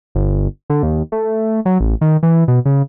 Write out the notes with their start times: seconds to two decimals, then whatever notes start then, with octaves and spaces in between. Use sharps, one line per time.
0.15 G1
0.70 D3
0.83 D#2
1.12 A3
1.65 F#3
1.80 A1
2.01 D#3
2.23 E3
2.48 B2
2.65 C#3